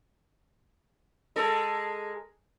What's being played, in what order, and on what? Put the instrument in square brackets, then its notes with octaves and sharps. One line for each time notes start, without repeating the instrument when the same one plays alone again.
[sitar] G#3 A4 A#4